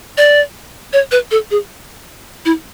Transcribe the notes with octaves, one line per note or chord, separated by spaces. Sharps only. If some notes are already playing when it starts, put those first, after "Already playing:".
D5
C#5
B4
A4
G#4
E4